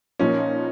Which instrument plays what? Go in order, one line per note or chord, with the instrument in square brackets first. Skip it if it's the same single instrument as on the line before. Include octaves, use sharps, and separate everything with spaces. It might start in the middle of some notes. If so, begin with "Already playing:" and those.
[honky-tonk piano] A#2 F3 A#3 D#4 [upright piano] C#4